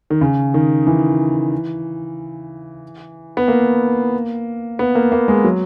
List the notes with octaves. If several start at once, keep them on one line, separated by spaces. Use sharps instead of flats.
D#3
C#3
D#3
E3
B3
A#3
B3
A#3
A#3
G#3
F#3